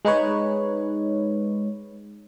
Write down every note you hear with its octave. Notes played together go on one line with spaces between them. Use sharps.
G#3 D#4 B4 C#5